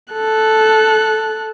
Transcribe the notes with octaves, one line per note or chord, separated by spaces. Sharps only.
A4 F#6